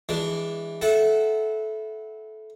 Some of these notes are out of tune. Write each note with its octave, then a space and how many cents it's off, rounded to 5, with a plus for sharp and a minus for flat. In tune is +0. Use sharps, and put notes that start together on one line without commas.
E3 +0 G#3 -20 D4 +0
E4 +0 A4 -20 F#5 +0